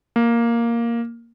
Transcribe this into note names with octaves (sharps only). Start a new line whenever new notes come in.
A#3